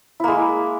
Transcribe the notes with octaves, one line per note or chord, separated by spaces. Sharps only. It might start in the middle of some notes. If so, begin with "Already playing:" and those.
G#3 A#3 E4